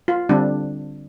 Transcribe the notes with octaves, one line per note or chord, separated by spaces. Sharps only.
F4
D3 G3 C4 D4